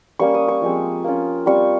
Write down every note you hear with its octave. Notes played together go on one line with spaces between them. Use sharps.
G3 A#3 C#4 C#6
D#6
C#6
F3 G#3 C4
A#3 C#4 F4
G3 C4 F4 C#6